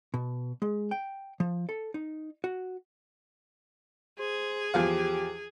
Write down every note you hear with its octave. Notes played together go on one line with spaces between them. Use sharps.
B2
G#3
G5
F3
A4
D#4
F#4
G#4 C5
E2 F3 G4 F5